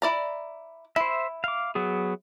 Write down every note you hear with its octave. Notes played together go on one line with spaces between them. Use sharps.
E4 D5 A#5
E4 C5 E5
F5 D6
F#3 B3 G#4